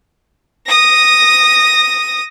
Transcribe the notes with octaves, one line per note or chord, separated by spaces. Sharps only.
D#6 A#6